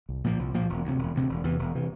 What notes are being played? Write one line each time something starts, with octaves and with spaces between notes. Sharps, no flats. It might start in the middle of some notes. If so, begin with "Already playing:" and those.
C2
A#2 F3 A#3
C2
A#2 F3 A#3
E1
D2 C3
E1
D2 C3
E1
E2 C3 E3
E1
C3 E3